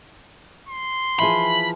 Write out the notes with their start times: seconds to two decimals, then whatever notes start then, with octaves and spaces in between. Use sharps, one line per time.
0.68 C6
1.19 E3 F3 G#4 B5